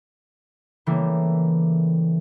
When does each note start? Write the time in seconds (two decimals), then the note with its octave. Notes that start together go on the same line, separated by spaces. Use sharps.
0.86 C#3 E3 G3 A3 A#3